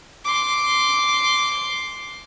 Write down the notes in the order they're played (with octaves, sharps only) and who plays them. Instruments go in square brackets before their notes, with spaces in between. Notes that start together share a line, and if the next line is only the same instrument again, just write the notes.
[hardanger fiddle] C6 D6